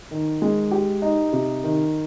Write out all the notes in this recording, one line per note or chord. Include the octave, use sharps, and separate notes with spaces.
D#3
G#3
G4
D#4
C3
D#3